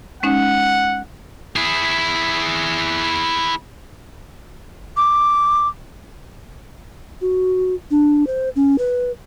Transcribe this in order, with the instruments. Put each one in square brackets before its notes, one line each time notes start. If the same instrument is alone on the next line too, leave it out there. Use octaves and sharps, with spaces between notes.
[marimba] G#3 C#4 D#4 [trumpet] F#5
[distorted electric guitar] E4 G#4
[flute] D6
[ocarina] F#4
D4
C5
C#4
B4